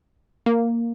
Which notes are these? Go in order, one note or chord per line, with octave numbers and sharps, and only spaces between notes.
A#3